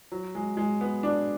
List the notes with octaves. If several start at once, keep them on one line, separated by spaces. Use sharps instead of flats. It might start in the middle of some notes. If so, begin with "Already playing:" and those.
F#3
G#3
G#3
B3
D4